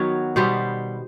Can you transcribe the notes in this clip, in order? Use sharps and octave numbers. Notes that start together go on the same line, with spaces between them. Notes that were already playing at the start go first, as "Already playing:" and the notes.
Already playing: D#3 F#3 B3 C#5
B2 G3 B3 C5